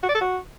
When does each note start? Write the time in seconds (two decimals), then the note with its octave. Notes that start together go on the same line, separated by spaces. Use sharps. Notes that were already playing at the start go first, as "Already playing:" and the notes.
0.03 F#4
0.09 D5
0.15 A4
0.21 F#4